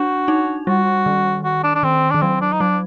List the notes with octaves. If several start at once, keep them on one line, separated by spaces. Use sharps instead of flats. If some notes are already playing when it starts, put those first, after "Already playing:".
Already playing: D4 F#4
D#4
G3 F#4
D#3
F#4
D4
D4
D#3 C4
D#3 D4
F#3 C4
D4
D#4
F#3 D4